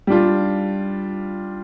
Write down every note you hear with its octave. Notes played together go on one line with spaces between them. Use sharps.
G3 D4 F4